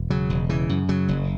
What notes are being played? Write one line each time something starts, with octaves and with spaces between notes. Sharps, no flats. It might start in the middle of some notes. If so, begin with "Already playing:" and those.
Already playing: E1
C#3 F#3
E1
C#3 E3
F#2
C#3 F#3
F#1